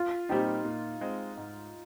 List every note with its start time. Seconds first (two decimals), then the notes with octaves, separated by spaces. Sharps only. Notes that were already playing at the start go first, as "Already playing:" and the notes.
Already playing: F4
0.29 A#2 G3 C4 D#4 G4
0.65 A#2
1.01 G#3 C4
1.37 G#2